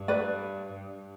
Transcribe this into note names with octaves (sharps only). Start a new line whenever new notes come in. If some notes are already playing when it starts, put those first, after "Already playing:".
Already playing: G2
B4 D5
G2